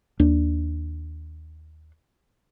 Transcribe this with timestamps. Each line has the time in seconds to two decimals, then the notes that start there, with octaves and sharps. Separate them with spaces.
0.20 D#2 D4